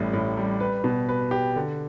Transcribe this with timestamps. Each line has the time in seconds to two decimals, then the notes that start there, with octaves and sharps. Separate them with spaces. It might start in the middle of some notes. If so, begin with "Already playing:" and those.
Already playing: A1 A2 G3
0.13 A2
0.37 G3
0.60 B4
0.84 B2
1.09 B4
1.31 G4
1.56 D3